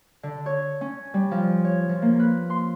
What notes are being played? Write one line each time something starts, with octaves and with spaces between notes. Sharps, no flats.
D3
C#5
C#4
G3
F3
C#5
F3
A#3
B4
C6